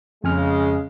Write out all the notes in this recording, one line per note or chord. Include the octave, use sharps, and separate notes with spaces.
F2 C#3 G#3 G#5 F6